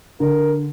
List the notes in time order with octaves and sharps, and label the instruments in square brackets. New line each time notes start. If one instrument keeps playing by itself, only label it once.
[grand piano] D3 [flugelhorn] A#4